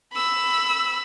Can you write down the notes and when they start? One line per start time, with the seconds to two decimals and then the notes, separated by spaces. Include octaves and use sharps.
0.13 B5 E6